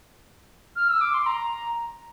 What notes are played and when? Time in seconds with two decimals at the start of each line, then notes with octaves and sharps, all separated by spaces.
0.76 F6
0.89 E6
1.01 D6
1.14 C6
1.26 A#5